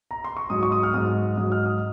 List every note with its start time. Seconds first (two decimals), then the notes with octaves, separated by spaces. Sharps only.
0.11 A#5
0.24 C6
0.37 C#6
0.50 G#2 F#3 D#6
0.63 C#6
0.72 D#6
0.83 F6
0.94 G#2 F#3 D#6
1.37 G#2 F#3 D#6
1.52 F6
1.65 D#6